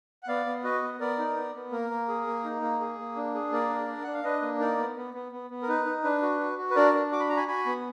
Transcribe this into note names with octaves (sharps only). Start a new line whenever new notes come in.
F#5
B3 D5 F5
B3
F#4 B4 D#5
B3
B3 A#4 D5
D#4
B3
B3
A#3 A#4
A#3
G#4
A#3
D#4
A#3
G#4
A#3
D4
G#4
A#3 A#4 D5
D4
D4
D4 F#5
F5
D4 B4 D#5
A#3
D#4 A#4 D5
B3
B3
B3
B3
B3
A#4
D#4 B4
D#4
D4 B4
F#4
F#4
F#4
B4
D4 A#4 D5
D4
F#4 D6
B5
F#4 A#5
G#5 B5
F#4 G#5 B5
B3